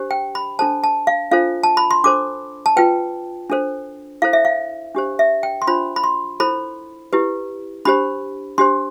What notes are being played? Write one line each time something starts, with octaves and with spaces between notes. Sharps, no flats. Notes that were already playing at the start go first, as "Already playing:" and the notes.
Already playing: D4 G4 C5
G5
B5
D4 A4 C5 A5
A5
F5
D4 F4 A4 C5 F5
A5
B5
C6
D4 A4 C5 D6
A5
F4 B4 G5
D4 A4 C5
E4 A4 C5 F5
E5
F5
D4 G4 C5
E5
G5
C6
D4 F4 C5 B5
B5
C6
E4 A4 C5 B5
E4 G4 B4
D4 G4 C5 B5
D4 G4 C5 C6